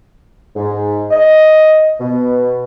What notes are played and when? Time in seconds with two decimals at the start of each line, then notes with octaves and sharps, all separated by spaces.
0.56 G#2
1.11 D#5
2.00 B2